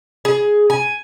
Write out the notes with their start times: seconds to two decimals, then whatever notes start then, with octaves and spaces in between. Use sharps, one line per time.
0.25 G#4
0.70 G#5